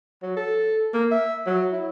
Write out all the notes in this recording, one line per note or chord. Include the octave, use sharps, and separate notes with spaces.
F#3
A4
A#3
E5
F#3
E4